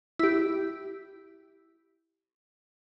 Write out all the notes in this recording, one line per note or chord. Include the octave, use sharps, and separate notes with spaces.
E4 G4